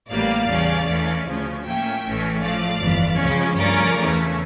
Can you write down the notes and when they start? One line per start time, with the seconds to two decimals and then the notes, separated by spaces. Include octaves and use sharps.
0.10 A1 A2 E3 G3 A#3 D5 F5
0.49 E2 C#3 G3 C#4
0.88 E2 E3 A3 C#4
1.27 D2 C#3 F3 C#4
1.65 A2 F3 A#3 C#4 E5 G5
2.03 A1 A2 E3 A3 C#4
2.42 A2 F3 A3 D5 F5
2.81 G1 F2 E3
3.19 C#2 C#3 F3 C#4
3.58 G2 F3 A3 C#4 A#4 D5
3.97 E2 C#3 E3 A3 C#4